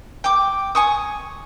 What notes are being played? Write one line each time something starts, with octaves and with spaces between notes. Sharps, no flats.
G5 D6
G#5 C#6 D#6